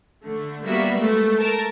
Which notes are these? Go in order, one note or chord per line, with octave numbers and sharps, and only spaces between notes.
D3 A3
G3 A#3 B3 F#4 E5
G#3 A3
A#4 A5